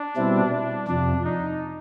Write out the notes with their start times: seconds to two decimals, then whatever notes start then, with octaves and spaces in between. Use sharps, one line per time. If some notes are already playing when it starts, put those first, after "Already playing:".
Already playing: D4
0.16 B2 G3 C4 E4
0.53 D4
0.88 F2 C3 F3 D4
1.25 D#4